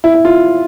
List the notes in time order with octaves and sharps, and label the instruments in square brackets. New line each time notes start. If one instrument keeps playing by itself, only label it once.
[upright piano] E4
E4
F4